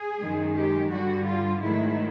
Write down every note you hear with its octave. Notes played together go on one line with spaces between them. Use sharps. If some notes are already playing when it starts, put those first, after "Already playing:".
Already playing: G#4
F#2 D#3 G#3
G4
G2 D3 G3 F#4
F4
G#2 D#3 F#3 A3 E4